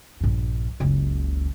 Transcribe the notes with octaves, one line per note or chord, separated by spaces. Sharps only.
A#1 G2
F#1 C#2